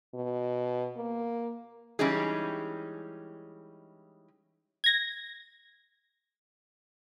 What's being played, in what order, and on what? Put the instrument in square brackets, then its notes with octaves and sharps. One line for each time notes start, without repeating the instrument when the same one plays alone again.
[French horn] B2
A#3
[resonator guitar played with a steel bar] E3 G3 G#3 C#4 D#4 G#4
[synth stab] G#6 A#6